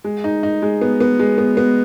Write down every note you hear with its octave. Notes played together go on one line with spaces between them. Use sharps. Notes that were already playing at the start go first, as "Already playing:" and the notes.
G#3
D#4
D#4
G#3
B3
B3
G#3
B3
B3